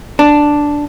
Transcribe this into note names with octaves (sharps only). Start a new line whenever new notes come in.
D4